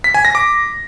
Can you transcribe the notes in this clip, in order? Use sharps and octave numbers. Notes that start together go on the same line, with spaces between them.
B6
G#5
A#6
D6